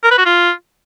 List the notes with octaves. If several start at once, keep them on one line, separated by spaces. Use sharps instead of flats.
A#4
B4
F#4
F4